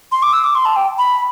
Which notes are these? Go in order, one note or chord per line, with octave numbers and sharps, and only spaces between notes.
C6
D6
E6
D6
C6
A5
G5
B5